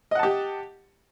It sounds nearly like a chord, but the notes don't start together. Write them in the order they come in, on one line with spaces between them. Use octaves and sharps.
D#5 F#5 A5 G4